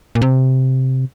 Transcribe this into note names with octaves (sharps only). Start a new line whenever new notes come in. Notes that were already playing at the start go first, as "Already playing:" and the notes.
A#2
C3